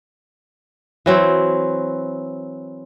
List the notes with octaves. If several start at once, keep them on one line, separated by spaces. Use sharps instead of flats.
E3 F#3 C4